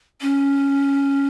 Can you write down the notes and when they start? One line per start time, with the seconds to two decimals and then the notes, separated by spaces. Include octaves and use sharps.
0.22 C#4